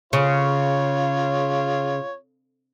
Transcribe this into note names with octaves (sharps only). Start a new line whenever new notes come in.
C#3 F4 C#5